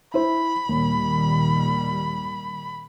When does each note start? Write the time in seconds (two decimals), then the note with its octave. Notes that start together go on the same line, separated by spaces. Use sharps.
0.14 E4 C5 B5
0.69 D#2 A#2 D#3 G3